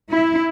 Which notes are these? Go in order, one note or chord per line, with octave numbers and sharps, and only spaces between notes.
E4